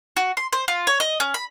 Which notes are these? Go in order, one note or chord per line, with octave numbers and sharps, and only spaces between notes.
F#4
C6
C5
F4
C#5
D#5
C#4
B5